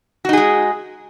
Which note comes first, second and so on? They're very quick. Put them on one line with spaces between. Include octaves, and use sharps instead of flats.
F#4 D#4 G#4 G#3